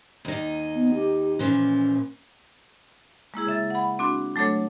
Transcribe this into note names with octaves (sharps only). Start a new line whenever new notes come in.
D#2 D#4
B3
G4
A#2 E3 F3 C#4
G#3 A#3 E4 G#4
C#3 E5 A6
F#5 B5
C4 D4 F#4 C6
F#3 A3 D4 A4 C#5